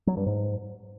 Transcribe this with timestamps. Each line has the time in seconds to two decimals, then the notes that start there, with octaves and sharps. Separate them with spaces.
0.07 F#3
0.17 G2
0.26 G#2